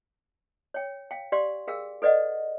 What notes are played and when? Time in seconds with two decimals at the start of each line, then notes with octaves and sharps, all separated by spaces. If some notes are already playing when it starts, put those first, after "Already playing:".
0.74 C#5 G5
1.11 F5 G5
1.32 G4 D5 F5 C6
1.68 G#4 A#4 F5 G5 E6
2.02 A4 B4 D5 D#5 F#5